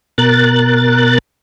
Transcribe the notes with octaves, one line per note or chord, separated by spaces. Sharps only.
B2 A#4 F#6 A6